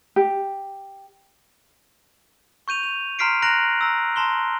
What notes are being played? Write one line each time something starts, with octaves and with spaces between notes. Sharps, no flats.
G4
C#6 G6 D#7 F7
F7
A#5 C6 F6 B6 C7 D7
A#5 F#6 A#6 D7 F7 F#7
A#5 E6
A5 A#5 C6 G7